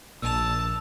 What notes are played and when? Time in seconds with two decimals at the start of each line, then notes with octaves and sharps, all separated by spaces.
0.22 A#1 A#2 A5 E6 F7